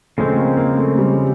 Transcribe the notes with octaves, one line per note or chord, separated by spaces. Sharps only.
C#3 F3 G#3 A3 C4
A#3
A#3
A3
G3